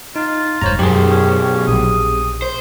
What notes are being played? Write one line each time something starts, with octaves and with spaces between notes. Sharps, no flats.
D#4 F4
E1 G2 C5 C#5 A#5
B1 F#2 G4 G#4 C5
C#4
A#1 D#6
C5